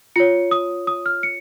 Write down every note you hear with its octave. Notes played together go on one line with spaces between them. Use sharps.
F4 C#5 C#7
D#6
D#6
F6
C#7